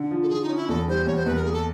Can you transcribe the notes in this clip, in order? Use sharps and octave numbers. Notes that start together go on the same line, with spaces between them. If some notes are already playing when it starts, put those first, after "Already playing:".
Already playing: D3
F3
A4
F3 G#4
D#4
C#4
E4
E2 A4
G3 C5
E2 C#5
C5
E2 B4
A#4
A#3 G#4
A4